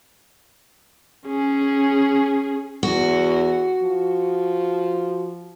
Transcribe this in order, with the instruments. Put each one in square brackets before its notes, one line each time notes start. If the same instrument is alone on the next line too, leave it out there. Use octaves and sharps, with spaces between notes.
[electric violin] C#4 G#4
[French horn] E2 [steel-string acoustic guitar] F#4
[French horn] F3